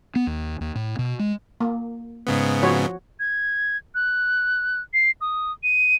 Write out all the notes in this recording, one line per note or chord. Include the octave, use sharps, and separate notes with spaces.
B3
D#2
D#2
A2
B2
G#3
A#3
G#2 C#3 B3
F3 F#4 C#5
G#6
F#6
C7
D#6
D#7